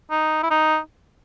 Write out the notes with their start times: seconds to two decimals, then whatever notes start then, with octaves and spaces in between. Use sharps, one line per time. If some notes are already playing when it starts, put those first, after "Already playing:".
0.11 D#4
0.43 E4
0.50 D#4